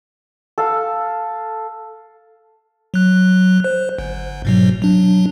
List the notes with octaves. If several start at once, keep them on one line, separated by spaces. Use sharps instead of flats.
A4 F5
F#3 F#6
C5
G1
G#2 B2 F#3
F#3 D4